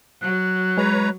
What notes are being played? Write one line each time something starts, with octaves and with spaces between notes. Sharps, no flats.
F#3 F#6
G#3 B4 C#5 A#5